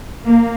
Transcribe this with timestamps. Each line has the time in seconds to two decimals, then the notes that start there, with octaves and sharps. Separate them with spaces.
0.25 A#3